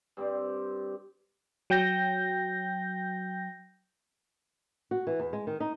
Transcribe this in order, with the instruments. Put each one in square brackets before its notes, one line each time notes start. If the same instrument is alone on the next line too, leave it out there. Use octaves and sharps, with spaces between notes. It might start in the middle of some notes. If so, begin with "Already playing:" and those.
[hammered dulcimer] G2 C4 C5 D5
[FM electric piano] F#3 G5 G6 A#6
[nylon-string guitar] F#4
E3
E2
G#3
D#3
D#4